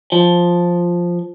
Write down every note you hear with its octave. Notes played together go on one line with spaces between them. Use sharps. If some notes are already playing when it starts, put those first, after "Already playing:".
F3